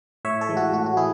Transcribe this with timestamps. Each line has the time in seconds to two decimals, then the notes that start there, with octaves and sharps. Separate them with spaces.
0.25 A2 C#5 E5
0.41 A4 C#5
0.49 E3 G#3
0.57 F#4
0.73 A2 F#4
0.86 F#4
0.97 E3 G#3 E4 G#4